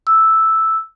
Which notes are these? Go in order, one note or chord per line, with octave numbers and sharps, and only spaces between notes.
E6